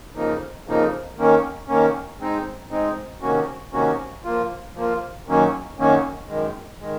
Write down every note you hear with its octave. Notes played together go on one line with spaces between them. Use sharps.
F2 C#3 F3 A#3 D#4
F2 C#3 F3 A#3 D#4
D#3 A#3 C#4
D#3 A#3 C#4
G#3 C4 D#4
G#3 C4 D#4
C3 D#3 A#3 C#4 F#4
C3 D#3 A#3 C#4 F#4
F3 A#3 F4
F3 A#3 F4
F#2 D#3 F#3 A#3 C#4
F#2 D#3 F#3 A#3 C#4
F#2 D#3 G#3
D#3 G#3